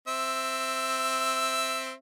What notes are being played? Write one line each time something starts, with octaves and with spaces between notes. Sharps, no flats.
C4 E5